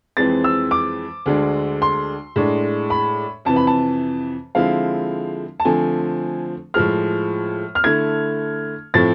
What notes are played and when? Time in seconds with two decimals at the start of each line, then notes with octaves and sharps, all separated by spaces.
0.17 F2 E3 G#3 C4 A6
0.44 E6
0.71 D6
1.26 D2 D3 G#3 D4
1.82 C6
2.36 A2 G#3 D4
2.90 B5
3.45 F2 C3 E3 A5
3.56 B5
3.67 A5
4.55 D3 F3 G#3 C4 E4 F5
5.60 A5
5.65 D3 F3 A3 C4 G#5
6.74 A2 F3 G#3 F6
7.75 F6
7.84 D3 A3 E4 G#6
8.94 A2 F3 A3 C4 A6